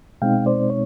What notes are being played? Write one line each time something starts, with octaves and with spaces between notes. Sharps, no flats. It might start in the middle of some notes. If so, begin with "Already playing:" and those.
B2 G#3 C4 D#4 F5 G5
C5 D5
C#5